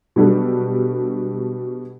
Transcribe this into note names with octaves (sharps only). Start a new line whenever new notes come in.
B2 F#3 G3 D4 F#4 A4